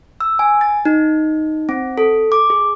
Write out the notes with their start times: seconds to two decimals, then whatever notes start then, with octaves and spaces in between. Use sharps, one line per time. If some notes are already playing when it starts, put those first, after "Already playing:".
0.20 E6
0.39 G#5
0.61 A6
0.85 D#4
1.69 C4
1.98 A4
2.32 D6
2.50 G#4